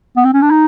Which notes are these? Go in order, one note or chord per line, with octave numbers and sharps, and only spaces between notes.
B3
C4
C#4
D4
D#4